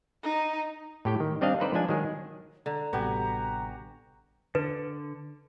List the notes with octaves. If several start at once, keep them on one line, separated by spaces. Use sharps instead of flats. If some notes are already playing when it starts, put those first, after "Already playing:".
D#4
A2 G4 G5
D#3
G3 C4 D4 D#5 F5
D#4 A4 B4 C5 D5
F3 G#3 D4 G#5
D#3 F#3 G#3 G#4
D3 A#5
A1 C3 G3 B3 F#4 G4 G#5
D3 B4